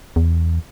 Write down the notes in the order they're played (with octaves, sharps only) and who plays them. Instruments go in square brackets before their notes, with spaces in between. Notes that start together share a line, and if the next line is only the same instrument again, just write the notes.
[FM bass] E2